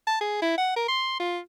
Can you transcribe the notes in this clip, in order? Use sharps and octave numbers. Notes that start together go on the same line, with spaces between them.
A5
G#4
E4
F#5
A#4
C6
F4